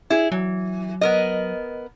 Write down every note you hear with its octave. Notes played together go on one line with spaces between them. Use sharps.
E4 G#4
E3 F#3
B3 A#4 D#5